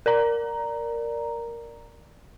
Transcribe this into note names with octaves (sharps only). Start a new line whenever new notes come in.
A#4 D5 A#5